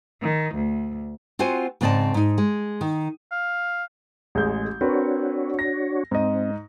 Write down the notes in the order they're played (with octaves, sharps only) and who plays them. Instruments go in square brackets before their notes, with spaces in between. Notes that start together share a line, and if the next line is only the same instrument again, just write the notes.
[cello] D#3
D2
[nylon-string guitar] C4 F4 F#4 C5 G#5
G#2 C#3 C4 D5 D#5 A5
G#2 D#4
G#3
D#3
[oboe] F5
[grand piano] A1 G#3 G6 [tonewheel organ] G#4
[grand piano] C4 A#4 B4 [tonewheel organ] D4 F#4 C#5
[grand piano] A#6
[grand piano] G#2 D#5 [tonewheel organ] C4